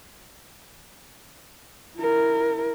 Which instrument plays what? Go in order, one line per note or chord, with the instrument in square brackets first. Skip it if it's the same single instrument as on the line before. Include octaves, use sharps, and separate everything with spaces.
[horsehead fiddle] E4 A#4